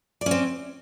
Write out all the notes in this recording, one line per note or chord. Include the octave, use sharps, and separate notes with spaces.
C4 C#4 D5